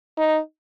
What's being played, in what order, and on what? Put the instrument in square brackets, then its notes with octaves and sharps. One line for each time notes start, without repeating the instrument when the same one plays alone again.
[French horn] D#4